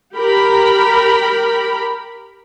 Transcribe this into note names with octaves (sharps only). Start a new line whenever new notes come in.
G4 A#4 B5